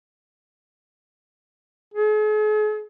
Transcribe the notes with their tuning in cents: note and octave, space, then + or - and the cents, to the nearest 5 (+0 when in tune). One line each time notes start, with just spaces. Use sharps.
G#4 +45